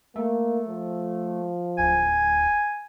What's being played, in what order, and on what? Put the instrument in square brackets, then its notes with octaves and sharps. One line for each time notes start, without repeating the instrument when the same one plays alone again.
[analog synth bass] A3 [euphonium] A#3
[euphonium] F3
[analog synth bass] D1 [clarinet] G#5